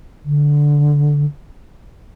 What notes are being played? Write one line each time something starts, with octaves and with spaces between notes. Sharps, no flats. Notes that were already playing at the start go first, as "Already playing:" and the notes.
D3